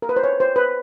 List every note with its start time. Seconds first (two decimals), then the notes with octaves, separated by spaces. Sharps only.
0.02 A#4
0.09 B4
0.16 C5
0.24 C#5
0.40 C5
0.56 B4